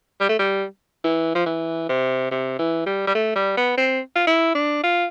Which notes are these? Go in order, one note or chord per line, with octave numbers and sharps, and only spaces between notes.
G3
A3
G3
E3
F3
E3
C3
C3
E3
G3
G3
A3
G3
B3
C4
F4
E4
D4
F4